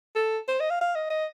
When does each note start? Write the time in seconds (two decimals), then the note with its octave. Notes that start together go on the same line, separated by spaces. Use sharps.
0.15 A4
0.48 C5
0.60 D#5
0.70 F5
0.81 F5
0.96 D#5
1.10 D#5